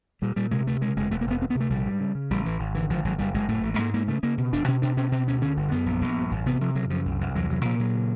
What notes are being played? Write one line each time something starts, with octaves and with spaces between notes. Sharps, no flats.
A#2 G3
A#2 G3
C3 G#3
D2 A3
C#3 G#3
F1 G#3
E1 A3
A#3
E1 B3
D2 C4
B3
C3
A3
A#1 G3
G#2
C#3
C#3
A1 G3
A1 E3
G#1
D3 E3
G#1 F3
G#1 F#3
F#1 G3
F#1 G#3
A2 A3
A1
A3
G#2 A#3
G#2 A#3
C#3 A3
C#3 A#3
B2
E1 D4
B2 C#4
B2 D4
B2 C#4
B2 C4
D2 C#4
D3 C#4
G1
F#2 B3
A#1
A#1
G2
A1
C3 B3
C3 F3
C#3 F#3
F#2 F3
C2
C2
E2 F#3
C3 F#3
A#2 F3
A#2 F#3
C#3